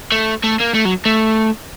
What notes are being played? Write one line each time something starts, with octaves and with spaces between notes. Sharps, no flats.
A3
A3
A#3
A3
F#3
A3